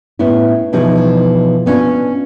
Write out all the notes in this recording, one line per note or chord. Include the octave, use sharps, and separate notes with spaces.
A2 B3 C#4 E4
B2 E3 F3 D#4 G#4 C#5
B3 C#4 D4 F4